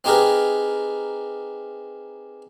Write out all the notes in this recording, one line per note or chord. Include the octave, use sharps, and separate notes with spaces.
C4 D#4 G4 G#4 A#4 B4